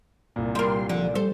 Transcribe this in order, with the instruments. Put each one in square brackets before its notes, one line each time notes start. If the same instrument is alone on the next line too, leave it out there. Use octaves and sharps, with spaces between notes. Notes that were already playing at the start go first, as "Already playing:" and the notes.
[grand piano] C2 A#2
[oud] G3 A#4 [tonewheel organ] C6
[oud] D3 [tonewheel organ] F3
[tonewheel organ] G3 [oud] A4 C5